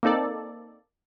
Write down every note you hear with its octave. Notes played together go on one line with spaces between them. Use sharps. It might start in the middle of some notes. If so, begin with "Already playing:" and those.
A#3 C4 D#4 A4 D5